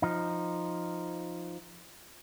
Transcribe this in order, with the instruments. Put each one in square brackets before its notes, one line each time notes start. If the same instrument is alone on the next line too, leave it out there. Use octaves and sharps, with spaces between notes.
[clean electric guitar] F3 D#4